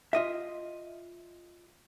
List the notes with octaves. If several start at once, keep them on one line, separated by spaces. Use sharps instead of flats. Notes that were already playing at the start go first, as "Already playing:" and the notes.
F4 D#5 E5